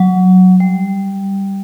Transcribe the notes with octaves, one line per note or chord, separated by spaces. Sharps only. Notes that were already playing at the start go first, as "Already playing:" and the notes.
Already playing: F#3
G3